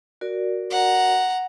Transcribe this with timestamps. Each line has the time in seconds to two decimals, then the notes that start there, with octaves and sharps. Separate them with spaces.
0.21 F#4 A#4 D5
0.71 F#5 A#5